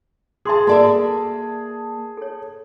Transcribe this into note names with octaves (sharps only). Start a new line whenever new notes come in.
G#4 E5 A5 C6 D6
A#3 F#4 A4 A#4 D5 E5
A4 C#5